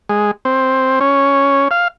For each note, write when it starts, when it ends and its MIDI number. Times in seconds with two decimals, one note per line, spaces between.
0.09 0.31 56
0.45 0.99 60
1.01 1.68 61
1.71 1.88 77